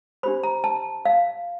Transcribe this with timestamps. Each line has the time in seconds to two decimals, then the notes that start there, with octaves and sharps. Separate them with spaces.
0.23 D4 G4 C5 B5
0.43 A#5
0.64 A5
1.05 F5